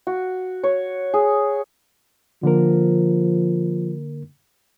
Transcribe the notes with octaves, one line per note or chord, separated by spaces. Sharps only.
F#4
C#5
G#4
D3 F3 A#3 A#4